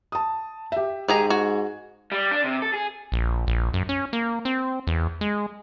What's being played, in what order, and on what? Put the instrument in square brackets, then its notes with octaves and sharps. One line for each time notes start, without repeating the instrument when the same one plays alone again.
[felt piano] A5 D#6
G4 E5
[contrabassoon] G#2 [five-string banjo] D#3 G#4 A#5 [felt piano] G4
[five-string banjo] F#4 [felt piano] G#6
[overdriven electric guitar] G3
D4
C3
A4
G#4
[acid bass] A#1
A#1
F#2
C#4
A#3
C4
E2
G#3